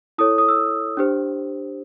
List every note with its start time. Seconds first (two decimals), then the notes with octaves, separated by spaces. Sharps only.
0.18 E4 A4 C#5 D#6
0.38 D#6
0.48 E6
0.97 D4 G4 C5